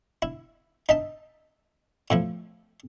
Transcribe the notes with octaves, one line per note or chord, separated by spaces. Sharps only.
E4
D#4 E5 A5
A2 F3 E4